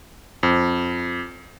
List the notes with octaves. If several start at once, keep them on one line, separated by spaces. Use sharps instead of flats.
F2